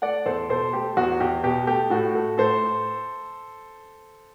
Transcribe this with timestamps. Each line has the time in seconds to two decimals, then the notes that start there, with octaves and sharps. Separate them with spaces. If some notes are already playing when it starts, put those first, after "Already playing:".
0.02 A3 D5 F#5
0.26 E2 A4 C5
0.49 B2 A4 C5
0.72 A3 G4
0.97 E2 F#4
1.20 E2 G4
1.43 B2 G4
1.67 A3 G4
1.90 A2 F#4 A4
2.15 A3
2.38 A2 A4 C5